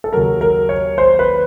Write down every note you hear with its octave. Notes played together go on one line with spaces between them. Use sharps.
A4
D#2 C#3 F#3 A#4
A#4
C#5
C5
B4